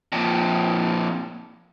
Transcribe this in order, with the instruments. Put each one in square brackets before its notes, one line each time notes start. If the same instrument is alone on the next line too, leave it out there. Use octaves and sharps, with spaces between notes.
[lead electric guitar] F2 A#2